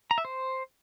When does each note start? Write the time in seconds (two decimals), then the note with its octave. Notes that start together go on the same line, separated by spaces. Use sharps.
0.11 A#5
0.18 E5
0.25 C5